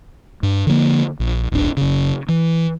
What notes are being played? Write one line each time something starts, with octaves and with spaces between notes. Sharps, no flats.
G2
D3 F3 G#3 A#3
A#1
D1 G#1 D4
F#1 C#3
E3